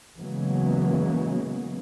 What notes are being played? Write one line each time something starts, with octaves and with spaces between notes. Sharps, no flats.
C#3 E3 F#3 G#3 A#3 B3